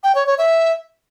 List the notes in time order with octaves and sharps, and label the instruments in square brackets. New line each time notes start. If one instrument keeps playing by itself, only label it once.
[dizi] G5
C#5
C#5
E5